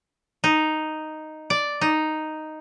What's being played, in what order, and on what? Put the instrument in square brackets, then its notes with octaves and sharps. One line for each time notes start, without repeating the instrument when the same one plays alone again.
[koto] D#4
D5
D#4